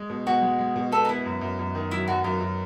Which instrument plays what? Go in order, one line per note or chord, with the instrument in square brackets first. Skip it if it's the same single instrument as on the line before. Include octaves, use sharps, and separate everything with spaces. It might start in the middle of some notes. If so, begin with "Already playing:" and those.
Already playing: [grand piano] G#3
B2
[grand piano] B2 [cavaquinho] F#4
[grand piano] G#3
G#3
B2
[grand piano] B3 [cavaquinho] A4
[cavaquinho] D#4
[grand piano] B3 [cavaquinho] E4
[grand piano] F#2
F#2
F#2
D#3
[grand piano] F#3 [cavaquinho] E4
[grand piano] F#2 [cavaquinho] F#4
[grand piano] F#2 [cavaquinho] F4
[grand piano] F#2